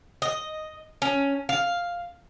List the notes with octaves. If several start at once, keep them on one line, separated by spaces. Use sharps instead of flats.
D#5
C#4
F5